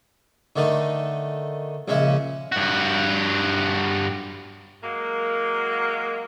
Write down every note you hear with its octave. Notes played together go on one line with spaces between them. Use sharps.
D3 D#3 A3 D#4
A#1 C#3 G#3 C#4 E5
G2 F#4
F#3 G#3 A#3